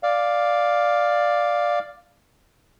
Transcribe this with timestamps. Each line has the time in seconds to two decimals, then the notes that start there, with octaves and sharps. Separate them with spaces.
0.03 D5 F5